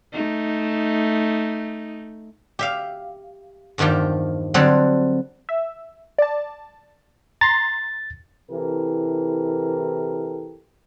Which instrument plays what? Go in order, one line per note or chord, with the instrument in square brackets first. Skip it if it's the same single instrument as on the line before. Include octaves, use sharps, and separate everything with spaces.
[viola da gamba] A3 D#4
[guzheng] G4 E5 F5
E2 G2 D#3 F3 G4
D3 F#3 G3 C4 A4
[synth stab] E5
D5 A5
[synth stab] A#5 C6 [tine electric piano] A6
[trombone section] C3 E3 E4 G4 A4 A#4